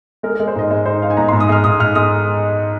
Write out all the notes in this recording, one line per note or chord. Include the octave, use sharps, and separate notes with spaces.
G#3 A#4
A#4
G#3
C5
G#2 D#5
G#3 C5
D#4 C5
D#4 F5
G#5
G#2 A#5
C6
G#2
D#6
G#3 F6
G#2 D#6
G#2 F6
G#3 D#6